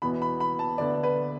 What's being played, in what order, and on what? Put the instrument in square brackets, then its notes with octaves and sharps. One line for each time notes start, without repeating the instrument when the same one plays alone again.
[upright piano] E2 B2 B3 E4 [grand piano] B5
[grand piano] B5
B5
A5
[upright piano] D2 D3 B3 [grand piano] D5
[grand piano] B4